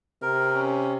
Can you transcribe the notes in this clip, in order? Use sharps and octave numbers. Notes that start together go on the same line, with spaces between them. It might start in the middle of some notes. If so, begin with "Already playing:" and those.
C3 A#4
C#4